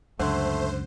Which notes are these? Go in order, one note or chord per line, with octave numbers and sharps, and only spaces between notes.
C#2 F#2 D3 A3 C5